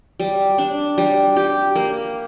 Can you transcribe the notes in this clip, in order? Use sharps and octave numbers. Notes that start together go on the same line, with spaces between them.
G3
D4
G3
G4
A#3